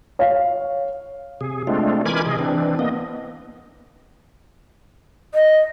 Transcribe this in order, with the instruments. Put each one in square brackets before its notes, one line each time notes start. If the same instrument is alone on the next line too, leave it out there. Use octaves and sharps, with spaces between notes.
[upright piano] C#5 F5
[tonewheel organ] C3 G#4
G#3 A3 C4 D4 F4
E3 A#4 G#5 B5 D6 G#6
C3 G#4 D#5
E3 C4 D4
A#3 B3 D#5
[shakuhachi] D#5